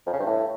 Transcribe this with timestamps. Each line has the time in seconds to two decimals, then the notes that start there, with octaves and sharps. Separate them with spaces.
0.06 F2
0.13 C#3
0.19 G2
0.26 A2